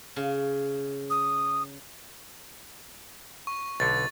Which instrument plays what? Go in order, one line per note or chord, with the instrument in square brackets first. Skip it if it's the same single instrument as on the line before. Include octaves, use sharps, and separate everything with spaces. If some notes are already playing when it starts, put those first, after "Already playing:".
[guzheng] C#3
[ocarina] D#6
[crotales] C#6
[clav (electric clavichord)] B1 D3 [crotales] A6